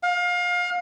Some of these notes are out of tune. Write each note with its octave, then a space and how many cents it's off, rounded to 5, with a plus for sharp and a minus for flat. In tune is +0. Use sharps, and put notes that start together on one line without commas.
F5 +30